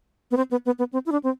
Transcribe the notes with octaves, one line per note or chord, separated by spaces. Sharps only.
B3
C4
B3
B3
B3
C4
E4
D4
C4